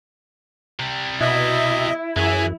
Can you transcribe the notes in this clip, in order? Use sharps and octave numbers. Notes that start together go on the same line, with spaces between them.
C3 G3
B2 E4 D#5 E5
F#2 E3 G#4 E5 G#5